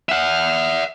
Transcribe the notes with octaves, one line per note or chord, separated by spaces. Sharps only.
E5 F#5